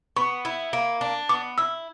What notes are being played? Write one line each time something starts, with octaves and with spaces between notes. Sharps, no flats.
B3 C#6
E4
A#3
D4
B3 D6
E4 E6